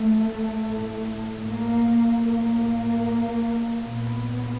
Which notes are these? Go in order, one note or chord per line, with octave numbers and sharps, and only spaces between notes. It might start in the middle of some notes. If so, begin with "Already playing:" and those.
Already playing: A3
A2
A#3
A2 A#3
A#2 B3